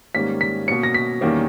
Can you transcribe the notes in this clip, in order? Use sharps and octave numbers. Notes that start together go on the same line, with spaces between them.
G#2 D#3 G3 A#3 C#4 B6
B6
B2 A#3 C#4 C#7
A#6
B6
E2 D#3 G3 A#3 C#4